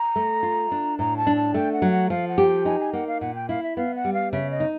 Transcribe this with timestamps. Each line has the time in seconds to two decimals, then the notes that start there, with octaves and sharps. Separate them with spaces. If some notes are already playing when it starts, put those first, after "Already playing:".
Already playing: A#5
0.16 A3
0.43 F4
0.72 D4
0.99 A2 A#5
1.17 A5
1.27 D4
1.36 A5
1.54 A3 G5
1.73 F#5
1.82 F#3
1.92 F#5
2.10 F3 F5
2.28 F#5
2.38 G4
2.47 G5
2.65 D#4 G#5
2.80 G#5
2.93 A#3 F#5
3.07 F5
3.21 A#2 F#5
3.35 G5
3.49 E4 F5
3.63 E5
3.77 B3 F5
3.95 F#5
4.05 G3
4.14 F5
4.32 C#3 E5
4.51 D#5
4.60 D#4